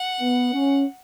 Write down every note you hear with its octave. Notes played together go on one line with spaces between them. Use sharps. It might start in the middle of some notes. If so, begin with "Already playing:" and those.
Already playing: F#5
B3
C#4